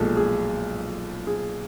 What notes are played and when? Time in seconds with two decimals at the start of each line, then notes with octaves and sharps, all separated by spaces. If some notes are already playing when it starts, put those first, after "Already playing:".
Already playing: B1 A#2 F3 G#3 A4
0.17 G#4
1.27 G#4